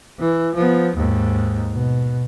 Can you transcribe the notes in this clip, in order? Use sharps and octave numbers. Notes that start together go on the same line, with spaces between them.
E3
F3 B3
D#2 G#2
B2